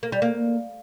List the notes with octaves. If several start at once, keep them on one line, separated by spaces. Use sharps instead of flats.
A#3
G3
A#3